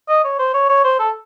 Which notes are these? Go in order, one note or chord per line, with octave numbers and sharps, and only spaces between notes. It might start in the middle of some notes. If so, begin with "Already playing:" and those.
D#5
C#5
C5
C#5
C#5
C5
A4